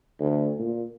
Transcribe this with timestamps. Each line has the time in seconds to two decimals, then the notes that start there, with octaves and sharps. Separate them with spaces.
0.20 D2
0.59 A#2